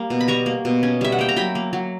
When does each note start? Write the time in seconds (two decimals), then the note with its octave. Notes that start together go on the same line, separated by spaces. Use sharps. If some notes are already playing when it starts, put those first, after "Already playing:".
Already playing: G3 A#3
0.10 B2
0.21 B5
0.28 G3 A#5 C#6
0.46 A#3
0.65 B2
0.83 C#4
1.01 G3 E5
1.12 F#5
1.19 A#3 G5
1.29 A#5
1.36 F#3 G5 B5
1.55 A#3
1.73 F#3